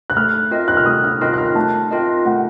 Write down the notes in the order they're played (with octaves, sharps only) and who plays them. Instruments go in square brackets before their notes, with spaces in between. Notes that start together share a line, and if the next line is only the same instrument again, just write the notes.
[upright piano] F#6
[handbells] A3 [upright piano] F6
[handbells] C4 F4 A#4 D#5
[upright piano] F#6
F6
[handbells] A3 [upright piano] D#6
[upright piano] F6
[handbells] C4 F4 A#4 D#5 [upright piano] F#6
[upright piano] F#6
F6
[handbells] A3 [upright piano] A5
[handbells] C4 F4 A#4 D#5
[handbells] A3 [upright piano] F#5